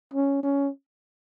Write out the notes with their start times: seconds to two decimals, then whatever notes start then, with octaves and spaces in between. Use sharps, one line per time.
0.14 C#4
0.43 C#4